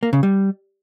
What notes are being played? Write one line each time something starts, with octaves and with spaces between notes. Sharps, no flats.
A#3
C#3
G3